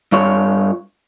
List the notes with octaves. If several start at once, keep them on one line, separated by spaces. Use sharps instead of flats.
G2 F4 C#5